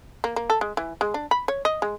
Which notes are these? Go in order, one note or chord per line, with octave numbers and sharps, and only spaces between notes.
A#3
A#3
A4
G#3
E3
G#3
D4
B5
C#5
D#5
G#3